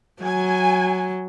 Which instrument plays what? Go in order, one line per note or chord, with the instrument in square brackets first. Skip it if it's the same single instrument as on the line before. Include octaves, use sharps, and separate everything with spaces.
[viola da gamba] F#3 [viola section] G#5